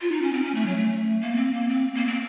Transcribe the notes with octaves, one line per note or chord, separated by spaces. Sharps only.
F4
D#4
C#4
C4
C#4
A3
F#3
A3
A#3
C4
A#3
C4
A#3
C4